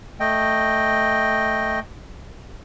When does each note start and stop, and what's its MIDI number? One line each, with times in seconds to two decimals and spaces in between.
0.20 1.80 57
0.20 1.80 75
0.20 1.80 79